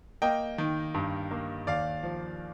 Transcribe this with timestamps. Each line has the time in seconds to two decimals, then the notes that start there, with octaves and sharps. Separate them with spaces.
0.22 A#3 D#5 G5
0.58 D#3
0.94 G2
1.31 A#3
1.67 D#2 D5 F5
2.03 F3